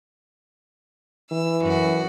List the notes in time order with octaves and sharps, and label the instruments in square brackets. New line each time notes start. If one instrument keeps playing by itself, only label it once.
[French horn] E3 [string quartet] E6
[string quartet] F#2 F#4